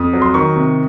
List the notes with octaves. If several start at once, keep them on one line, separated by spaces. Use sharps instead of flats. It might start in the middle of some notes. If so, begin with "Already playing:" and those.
Already playing: F2 D#6
F#3
C6
D#3 C#6
C3